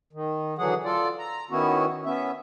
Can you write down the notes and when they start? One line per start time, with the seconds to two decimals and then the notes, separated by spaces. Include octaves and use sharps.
0.13 D#3
0.58 D3 E3 F#3 G#4 F#5
0.85 F4 A4 D5
1.19 A#5
1.51 D#3 B3 C#4 E4 F#4
2.06 B3 C#4 E5